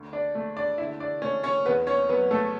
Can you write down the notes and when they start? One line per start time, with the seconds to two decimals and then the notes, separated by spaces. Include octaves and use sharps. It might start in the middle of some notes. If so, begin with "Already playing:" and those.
Already playing: D2
0.13 D4 D5
0.35 A3
0.57 D4 D5
0.78 D3 E4 E5
1.00 D4 D5
1.22 A3 C#4 C#5
1.43 C#4 C#5
1.65 E2 B3 B4
1.87 C#4 C#5
2.09 F#3 B3 B4
2.31 A3 A4